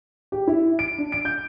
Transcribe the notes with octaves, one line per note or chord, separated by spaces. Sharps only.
G4
E4
D7
D4
D7
G6